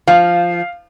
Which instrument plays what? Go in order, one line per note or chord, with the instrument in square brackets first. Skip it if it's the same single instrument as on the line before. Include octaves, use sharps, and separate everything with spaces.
[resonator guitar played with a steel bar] F3 [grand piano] F5